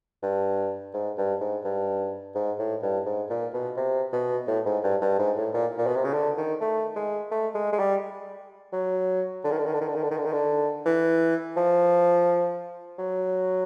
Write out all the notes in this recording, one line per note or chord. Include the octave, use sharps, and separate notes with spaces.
G2
G#2
G2
G#2
G2
G#2
A2
G2
G#2
A#2
B2
C3
B2
A2
G#2
G2
G2
G#2
A2
A#2
A#2
B2
C3
C#3
D3
D#3
A3
G#3
A3
G#3
G#3
G3
F#3
D3
D#3
D3
D#3
D3
D#3
D3
D#3
D3
D#3
D3
D#3
D3
E3
F3
F#3